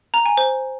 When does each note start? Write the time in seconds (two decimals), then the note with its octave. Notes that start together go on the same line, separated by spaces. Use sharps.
0.14 A#5
0.26 G#5
0.37 C5